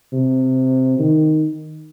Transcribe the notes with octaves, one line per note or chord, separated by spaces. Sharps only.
C3
D#3